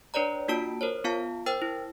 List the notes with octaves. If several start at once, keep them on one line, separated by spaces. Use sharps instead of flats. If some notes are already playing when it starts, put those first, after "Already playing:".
D4 B4 C#5 D5 A#5
A#3 D4 F4 F#4 A5 D7
A#4 C5 C#5
B3 F4 F5 A5
A#4 C5 G5 E6 A6
E4